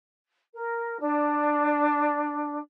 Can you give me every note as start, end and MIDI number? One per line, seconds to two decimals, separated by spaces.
0.54 0.96 70
0.99 2.58 62